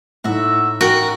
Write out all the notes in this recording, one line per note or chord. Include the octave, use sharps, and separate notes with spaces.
A2 D#4 F#4 E5
F#4 A#4 G5 A#5